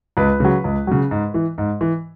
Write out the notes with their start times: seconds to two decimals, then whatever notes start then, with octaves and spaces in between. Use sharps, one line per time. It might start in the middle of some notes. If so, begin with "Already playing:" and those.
0.17 C#2 B4
0.40 C#3 F#3
0.64 C#2
0.87 C#3 F#3
1.11 G#2
1.34 E3
1.58 G#2
1.81 E3